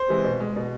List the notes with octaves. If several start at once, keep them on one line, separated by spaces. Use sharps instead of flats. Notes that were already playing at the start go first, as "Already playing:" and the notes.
Already playing: C5
C3 E3 G#3
B2
G#3
B2